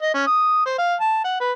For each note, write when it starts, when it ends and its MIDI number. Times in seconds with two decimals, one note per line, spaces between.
0.02 0.13 75
0.14 0.26 61
0.27 0.64 87
0.66 0.75 72
0.78 0.95 77
1.00 1.21 81
1.24 1.39 78
1.41 1.52 71